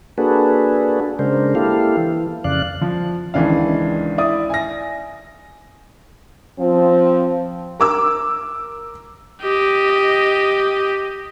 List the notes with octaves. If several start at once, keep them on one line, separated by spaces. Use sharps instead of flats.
A#3 D4 F#4 G#4 A4 B4
C#3 G#3 D4 A#4 C5
A#3 E4 G4 A4 F5
E3
F2 C#3 D5 F5 F#6
F3
C#2 D#3 E3 D4 F5
E4 D5 D#6
G#5 A#6
F3 C4
A#4 D6 E6
G4 D#5